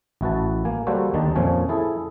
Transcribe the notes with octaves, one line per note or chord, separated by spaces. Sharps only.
A1 E4 F#4 B4 A5
A#3 G#5
G3 A#3 F#4 A4 C5 C#5
D#2 D#3 D4 D#4 A5
F2 A#2 F3 C#4 G#5
E4 G#4 A4